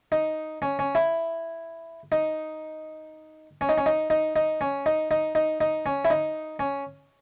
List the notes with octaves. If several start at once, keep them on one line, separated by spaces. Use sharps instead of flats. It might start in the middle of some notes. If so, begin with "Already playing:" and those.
D#4
C#4
C#4
E4
D#4
C#4
D#4
C#4
D#4
D#4
D#4
C#4
D#4
D#4
D#4
D#4
C#4
E4
D#4
C#4